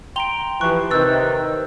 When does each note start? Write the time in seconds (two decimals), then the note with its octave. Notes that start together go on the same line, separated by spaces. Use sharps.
0.16 G5 A#5 C6 D7 F7 G7
0.61 E3 F3 G4 C#6 F#6
0.91 C3 D#3 B4 E6 F#6 G6 A6